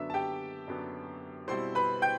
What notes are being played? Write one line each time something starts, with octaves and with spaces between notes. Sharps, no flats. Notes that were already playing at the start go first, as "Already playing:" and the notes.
Already playing: F#2 D3 F#3 B3 D4 E5 E6
A5
G4 G5
F#2 D3 F#3 B3 D4
B2 G3 C4 E4 C5 C6
B4 B5
G5 G6